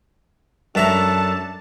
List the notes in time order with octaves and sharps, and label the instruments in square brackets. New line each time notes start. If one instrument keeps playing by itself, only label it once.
[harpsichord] F#2 E5 A#5 [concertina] D4 A4 [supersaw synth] A5